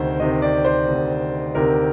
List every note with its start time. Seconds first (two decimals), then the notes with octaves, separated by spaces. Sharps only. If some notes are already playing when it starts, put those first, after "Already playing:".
Already playing: D2 C3 D#3 C5
0.19 D2 C3 D#3 D#5
0.42 D5
0.65 C5
0.87 D2 C3 D#3
1.55 D2 C3 D#3 A#4